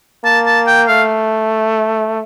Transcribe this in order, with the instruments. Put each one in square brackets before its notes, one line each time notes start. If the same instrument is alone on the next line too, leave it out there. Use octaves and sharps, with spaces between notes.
[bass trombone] A#3 [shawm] A5
[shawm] A5
G5
[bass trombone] A3 [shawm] F5